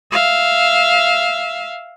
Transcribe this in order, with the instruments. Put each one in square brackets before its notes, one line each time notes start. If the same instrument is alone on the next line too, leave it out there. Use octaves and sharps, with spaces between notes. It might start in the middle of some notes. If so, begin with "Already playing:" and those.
[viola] E5 F5